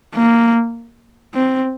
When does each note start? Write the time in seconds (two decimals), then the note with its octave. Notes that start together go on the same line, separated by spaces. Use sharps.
0.15 A#3
1.35 C4